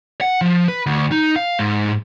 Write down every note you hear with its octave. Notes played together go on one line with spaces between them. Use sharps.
F#5
F3
B4
D2
D#4
F5
G#2